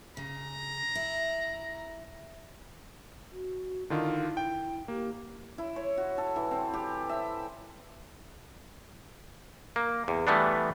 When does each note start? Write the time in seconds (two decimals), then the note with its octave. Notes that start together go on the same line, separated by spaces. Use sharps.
0.17 C#3 A#5
0.95 E4
3.32 F#4
3.90 D3 D#3 E4 F4
4.37 G5
4.88 A#3 G4
5.58 E4
5.76 C#5
5.98 F#4
6.18 A4
6.36 E3
6.51 C4
6.73 G4
7.09 E5
9.76 A#3
10.08 E2
10.27 E3 G3 A3 B3 D4